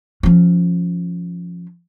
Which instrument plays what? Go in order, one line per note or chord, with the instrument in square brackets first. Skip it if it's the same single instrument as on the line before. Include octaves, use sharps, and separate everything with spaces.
[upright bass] F3 C#4